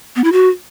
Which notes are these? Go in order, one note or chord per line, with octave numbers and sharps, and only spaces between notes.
B3
E4
F#4